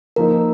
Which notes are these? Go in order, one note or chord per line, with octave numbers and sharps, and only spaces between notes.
F3 A#3 D#4 A#4